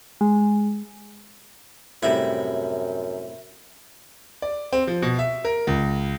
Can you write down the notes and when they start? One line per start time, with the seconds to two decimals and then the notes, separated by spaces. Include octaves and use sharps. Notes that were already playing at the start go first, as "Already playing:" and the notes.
0.21 G#3
2.03 F#2 A2 C3 G3 E4
4.42 D5
4.73 C4
4.87 F3
5.02 B2
5.19 E5
5.45 A#4
5.67 C#2